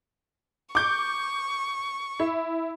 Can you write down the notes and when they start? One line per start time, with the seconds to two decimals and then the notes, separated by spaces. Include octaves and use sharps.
0.75 C#6 D6 G6
2.20 E4